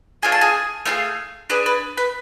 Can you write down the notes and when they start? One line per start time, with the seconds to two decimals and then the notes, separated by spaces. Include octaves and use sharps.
0.23 A3 D4 F4 G#4 G#5
0.32 A5
0.41 G#4 G#5
0.86 A3 D4 F4 G#4 F5
1.50 D4 G#4 B4
1.66 B4
1.97 B4